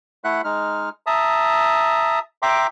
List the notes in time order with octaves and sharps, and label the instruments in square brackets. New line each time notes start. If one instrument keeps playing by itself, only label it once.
[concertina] A3 E4 E5 F#5 F#6
G#3 D#4 F6
E5 A5 A#5 D#6
E5 G5 A#5 C6 D6